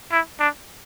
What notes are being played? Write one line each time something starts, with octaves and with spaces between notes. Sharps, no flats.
E4
D4